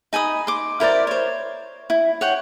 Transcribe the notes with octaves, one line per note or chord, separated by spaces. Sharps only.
D#4 G#5 B5 D#6
C6 D6
E4 A#4 C5 D5
C5 C#5
E4
C#5 F#5 G5